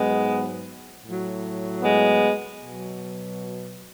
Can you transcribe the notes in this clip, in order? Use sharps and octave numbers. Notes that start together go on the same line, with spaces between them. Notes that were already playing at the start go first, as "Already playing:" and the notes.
Already playing: G#2 F#3 G#3 B3
A2 F#3
G#3 B3
B2 F#3